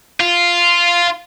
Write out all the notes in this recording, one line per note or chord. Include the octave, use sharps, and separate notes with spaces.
F4